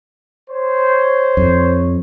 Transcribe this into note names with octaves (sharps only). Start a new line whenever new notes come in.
C5 C#5
F2